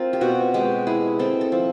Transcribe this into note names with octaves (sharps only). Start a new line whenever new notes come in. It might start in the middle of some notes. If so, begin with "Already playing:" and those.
Already playing: C4 F4 A#4
G4
B2 F#4
G#3 G4
E4 G#4
C4 A4
A4
F3